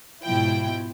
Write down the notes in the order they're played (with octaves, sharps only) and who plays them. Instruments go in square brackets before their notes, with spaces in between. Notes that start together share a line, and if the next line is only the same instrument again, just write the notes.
[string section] G#2 B2 F3 E4 G5